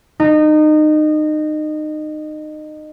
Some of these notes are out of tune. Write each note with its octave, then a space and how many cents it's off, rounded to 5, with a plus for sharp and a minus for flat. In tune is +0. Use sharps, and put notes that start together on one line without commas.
D#4 -25